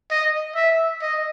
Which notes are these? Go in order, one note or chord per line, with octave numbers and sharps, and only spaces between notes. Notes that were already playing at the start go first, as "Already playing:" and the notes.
D#5
E5
D#5